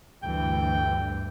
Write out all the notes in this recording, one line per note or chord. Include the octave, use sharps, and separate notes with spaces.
D2 G2 E3 G5